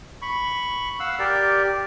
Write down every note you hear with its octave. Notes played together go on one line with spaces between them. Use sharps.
B5 C#6
F5 F#5 E6
G4 A#4 D5